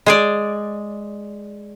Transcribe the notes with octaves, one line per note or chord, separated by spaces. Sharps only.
G#3 G#4 D5